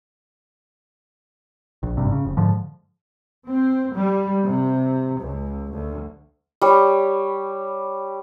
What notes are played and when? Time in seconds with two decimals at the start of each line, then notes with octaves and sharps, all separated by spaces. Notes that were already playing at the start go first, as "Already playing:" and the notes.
1.83 A#1
1.97 G#1 G2 C3
2.12 C#3
2.25 F1
2.37 G#2 D3 F3
3.48 C4
3.94 G3
4.43 C3
5.20 C#2
5.71 D2
6.62 G3 C#5